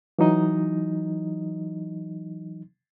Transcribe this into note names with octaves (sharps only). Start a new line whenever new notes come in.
E3 F#3 D#4 D#5